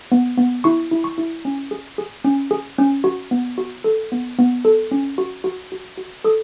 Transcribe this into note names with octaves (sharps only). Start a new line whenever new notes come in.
B3
B3
E4 C#6
E4
C#6
E4
C#4
G#4
G#4
C#4
G#4
C#4
F#4
B3
F#4
A4
B3
B3
A4
C#4
F#4
F#4
F#4
F#4
A4 D#6